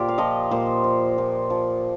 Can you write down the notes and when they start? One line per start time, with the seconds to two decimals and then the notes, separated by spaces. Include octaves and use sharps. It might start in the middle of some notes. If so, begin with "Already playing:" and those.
Already playing: A#2 F4 G4 A#4 C5
0.09 F5
0.18 F3 D#5
0.51 A#2 C5
0.84 F3
1.18 A#2
1.50 F3